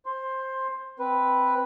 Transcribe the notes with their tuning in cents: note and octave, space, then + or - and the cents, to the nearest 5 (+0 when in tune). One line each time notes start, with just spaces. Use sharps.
C5 +15 C6 +10
C4 +0 B4 +0